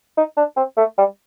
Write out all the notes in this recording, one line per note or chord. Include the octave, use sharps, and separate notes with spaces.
D#4
D4
C4
A3
G3